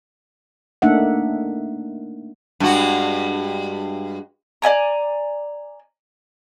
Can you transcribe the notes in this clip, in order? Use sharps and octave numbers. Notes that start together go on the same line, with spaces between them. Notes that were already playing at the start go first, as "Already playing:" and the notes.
A3 A#3 D4 D#4 E5 F#5
G2 G#3 F#4
D5 D#5 G#5 A#5